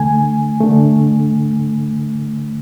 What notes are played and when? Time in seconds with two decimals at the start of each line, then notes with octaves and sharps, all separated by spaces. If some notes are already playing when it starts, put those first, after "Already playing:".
Already playing: D3 A3 G#5
0.61 D3 A3